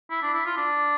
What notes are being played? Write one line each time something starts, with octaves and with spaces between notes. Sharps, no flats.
E4
D4
E4
F4
D4